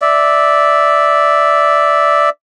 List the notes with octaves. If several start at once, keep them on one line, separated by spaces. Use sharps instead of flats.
D5 E5